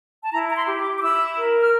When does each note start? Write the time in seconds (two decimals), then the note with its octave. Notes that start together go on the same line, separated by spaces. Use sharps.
0.23 A5
0.32 E4 A#5
0.49 A#5
0.56 C6
0.68 G4
0.79 D6
0.97 D6
1.02 E4 E6
1.37 A#4
1.60 F6